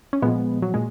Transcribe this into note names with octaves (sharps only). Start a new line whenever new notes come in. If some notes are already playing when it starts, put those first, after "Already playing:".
C#4
A#2 F3 G#3 B3
F#3
A#2 G#3